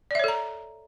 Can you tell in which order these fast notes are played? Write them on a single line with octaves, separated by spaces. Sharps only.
D5 E5 C#5 A4 A#5